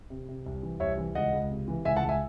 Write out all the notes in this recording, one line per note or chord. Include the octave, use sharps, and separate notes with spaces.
C3
C3
C2
E3
C2 C#5 E5
E3
C#2 D#5 F#5
C#2
C3
E3
C#2 E5 G#5
F#5 A5
C#2
E5 G#5